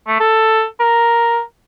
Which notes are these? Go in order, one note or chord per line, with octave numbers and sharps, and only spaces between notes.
A3
A4
A#4